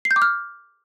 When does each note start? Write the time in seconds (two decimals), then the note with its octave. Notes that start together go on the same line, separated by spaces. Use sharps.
0.05 C7
0.11 G6
0.16 D6
0.22 F6